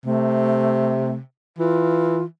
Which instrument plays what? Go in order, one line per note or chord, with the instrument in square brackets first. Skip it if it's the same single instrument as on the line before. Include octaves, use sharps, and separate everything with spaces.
[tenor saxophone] C3 [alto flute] A3
[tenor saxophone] E3 [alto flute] F4